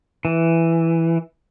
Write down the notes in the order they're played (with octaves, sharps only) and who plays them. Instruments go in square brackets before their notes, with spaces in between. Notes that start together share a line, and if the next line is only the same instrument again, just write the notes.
[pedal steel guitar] E3